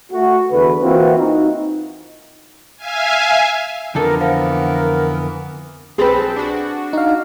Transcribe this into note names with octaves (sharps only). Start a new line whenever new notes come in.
A3 F#4
E2 D3 B4
E3 A#3 C4 F4 F#4
D#4
E5 F5 G#5
F2 D3 E3 B3 A4 A#4
A#4 C5 F5 F#5
B1 C4 G#4 A4 B4
D4 F#4
D#4 F5